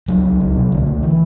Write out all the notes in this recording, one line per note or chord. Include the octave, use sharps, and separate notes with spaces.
C#2 F#3
C#2
C#2
B2
C#2 D3
C#2
E3